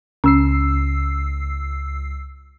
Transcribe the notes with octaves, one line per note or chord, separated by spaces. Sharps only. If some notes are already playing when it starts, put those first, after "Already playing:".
C#2 C#4 E6 C7